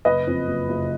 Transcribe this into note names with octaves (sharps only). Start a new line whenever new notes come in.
F#1 B4 D#5
F2
F#1
F#1